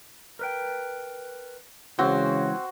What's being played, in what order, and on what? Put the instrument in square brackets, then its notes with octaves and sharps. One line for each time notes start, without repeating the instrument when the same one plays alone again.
[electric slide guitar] A#4 B4 G5
[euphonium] C#3 [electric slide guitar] E3 G#3 [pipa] C4 [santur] F#4 C5